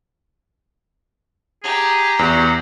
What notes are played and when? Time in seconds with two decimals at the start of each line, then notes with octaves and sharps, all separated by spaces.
1.63 G4 G#4 A#5
2.19 E2 F#4